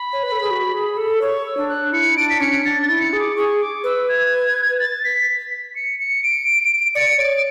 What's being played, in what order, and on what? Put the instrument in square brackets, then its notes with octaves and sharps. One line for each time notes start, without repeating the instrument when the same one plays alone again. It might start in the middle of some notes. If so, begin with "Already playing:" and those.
Already playing: [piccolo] B5
[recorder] C#5
B4
A4
G#4
F#4
G#4
A4
[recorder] C#5 [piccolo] C#6
[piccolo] E6
[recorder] D4
[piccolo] F#6
[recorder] E4 [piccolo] C#7
[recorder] D4 [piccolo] D7
[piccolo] B6
[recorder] C#4 [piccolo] C#7
[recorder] D4 [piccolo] A6
[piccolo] A6
[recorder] E4
[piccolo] C#7
[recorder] G#4
[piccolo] D6
[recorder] G#4 [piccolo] C#6
[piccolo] D6
[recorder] B4 [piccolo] E6
[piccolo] G#6
A6
B6
B6
C#7
C#7
D7
[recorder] D5 [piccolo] C#7
[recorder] C#5 [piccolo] D7